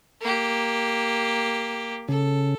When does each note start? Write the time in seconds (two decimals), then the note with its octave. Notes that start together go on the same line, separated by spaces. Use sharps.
0.21 A#3 G4
2.09 C#3 A4